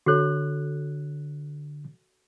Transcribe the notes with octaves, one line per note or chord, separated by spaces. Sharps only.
D3 F#4 A4 C#5 F#6